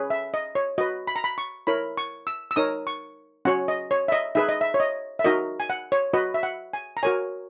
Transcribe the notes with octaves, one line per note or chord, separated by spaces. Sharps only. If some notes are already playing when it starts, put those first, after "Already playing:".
Already playing: C#4 G#4 B4
E5
D#5
C#5
F#4 B4 D#5
B5
A#5
B5
C#6
E4 A#4 C#5 B5
C#6
E6
E6
D#4 A#4 C#5 D#6
C#6
C#4 F#4 C#5 F#5
D#5
C#5
E5
D#5
D#4 G#4 B4 E5
D#5
E5
C#5
D#5
E5
D#4 F#4 A#4 D#5
G#5
F#5
C#5
F#4 B4 D#5
E5
F#5
G#5
A#5
F#4 A#4 C#5 G#5